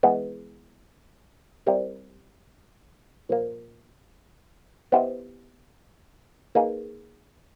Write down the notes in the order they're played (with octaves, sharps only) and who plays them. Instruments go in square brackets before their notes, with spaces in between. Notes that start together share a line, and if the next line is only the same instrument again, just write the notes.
[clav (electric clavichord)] E3 G#3 B3
G3 C4 E4 G4 A#4
A#2 F3 A#3
B3 E4 G4 C5 D#5
A#3 D#4 G#4 B4